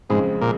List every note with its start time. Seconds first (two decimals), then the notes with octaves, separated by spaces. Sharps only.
0.09 F2 G#2 C#3 F3 G#3 C4
0.42 A#2